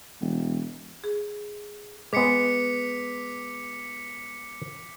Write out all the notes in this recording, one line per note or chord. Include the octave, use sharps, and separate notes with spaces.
E1
G#4
G#3 B3 D6 B6 C#7